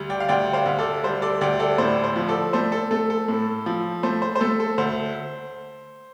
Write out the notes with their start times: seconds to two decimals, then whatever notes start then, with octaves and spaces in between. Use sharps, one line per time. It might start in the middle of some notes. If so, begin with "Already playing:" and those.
Already playing: D2 G3
0.10 D5 G5
0.20 F5
0.29 D2 D5 G5
0.53 C5 F5
0.66 D2
0.79 A4 D5
1.03 G3 C5
1.22 A4 D5
1.41 D2 D5 G5
1.59 A4 D5
1.78 A2 C5
2.04 C5
2.16 F3
2.28 A4 D5
2.53 A3 C5
2.72 A4
2.91 A3 A4
3.10 A4
3.28 A2
3.66 F3
4.03 A3 C5
4.22 C5
4.36 C5
4.40 A3 A4
4.60 A4
4.78 D2 C5